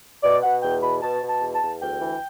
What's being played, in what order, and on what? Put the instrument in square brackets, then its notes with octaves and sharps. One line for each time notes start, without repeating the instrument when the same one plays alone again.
[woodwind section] B2 D5
B2 F#5
E2 G5
B2 B5
B2 A5
B2
A5
E2
A5
E2
D2 G5
E3